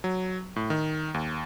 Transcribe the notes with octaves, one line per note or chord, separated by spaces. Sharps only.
F#3
A2
D#3
D#2